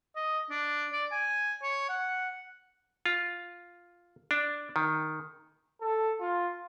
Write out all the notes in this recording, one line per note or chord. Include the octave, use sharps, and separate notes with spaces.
D#5
D4
D5
G#5
C#5
F#5
F4
D4
D#3
A4
F4